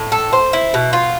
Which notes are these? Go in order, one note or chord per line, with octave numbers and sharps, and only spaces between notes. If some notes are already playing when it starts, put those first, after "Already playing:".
Already playing: A2
A4
C5
E4
B2
F4